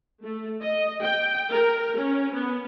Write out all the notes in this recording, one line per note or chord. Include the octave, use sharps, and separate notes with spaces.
A3
D#5
G5
A#4
C#4
B3